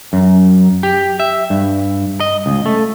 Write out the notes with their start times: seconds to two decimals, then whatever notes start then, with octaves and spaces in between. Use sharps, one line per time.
0.13 F#2
0.83 G4
1.20 E5
1.50 G2
2.20 D#5
2.46 C#2
2.66 A3